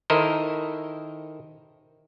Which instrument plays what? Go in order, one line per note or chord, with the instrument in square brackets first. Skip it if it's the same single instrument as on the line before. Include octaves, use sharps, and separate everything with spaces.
[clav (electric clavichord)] D#3 E4 A4 A#4 C5 D#5